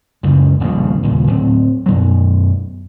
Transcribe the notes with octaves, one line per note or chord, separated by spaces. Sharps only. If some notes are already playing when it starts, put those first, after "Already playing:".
F#1 C#2 F#2
D#1 A#1 F2 C#3
D#2 A#2 C#3
D1 C4
F#2 B2 F#3